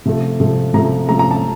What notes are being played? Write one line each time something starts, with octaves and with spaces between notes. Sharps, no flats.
C3 F3 A3
C3 F3 A3
C3 F3 A3 A#5
C3 F3 A3 A#5
A#5
A5